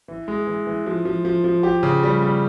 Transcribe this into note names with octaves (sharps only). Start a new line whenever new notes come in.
E3
G#3
E3
E3
F3
F3
F3
F3
G4
C#3
G3
G3